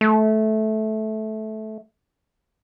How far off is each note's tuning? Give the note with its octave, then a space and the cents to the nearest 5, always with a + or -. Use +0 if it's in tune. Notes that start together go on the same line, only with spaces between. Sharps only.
A3 -15